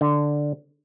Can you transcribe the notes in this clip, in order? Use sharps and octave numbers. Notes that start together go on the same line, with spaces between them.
D3